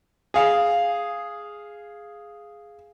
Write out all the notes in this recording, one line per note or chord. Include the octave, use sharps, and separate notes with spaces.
G#4 F5